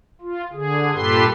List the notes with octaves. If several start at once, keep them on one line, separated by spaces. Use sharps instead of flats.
F4
D3 G#4
G2 A#2 G4 A4 B4 C6